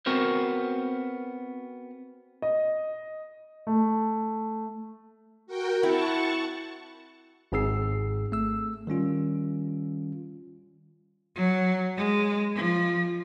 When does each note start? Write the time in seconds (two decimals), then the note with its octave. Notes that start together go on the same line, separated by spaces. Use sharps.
0.06 B3 C4 F#4 A#4 C5
2.42 D#5
3.67 A3
5.47 F#4 A#4 G5
5.83 C4 E4 F#5 A5 C#6
7.52 G#1 G#2 C4 G#4 E6 C7
8.32 A3 E6
8.87 D#3 G3 C#4 F4
11.36 F#3
11.97 G#3
12.56 F3